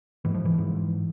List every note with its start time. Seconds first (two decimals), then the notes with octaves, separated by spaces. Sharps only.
0.25 G#2 E3
0.35 F3
0.45 E3
0.58 G#2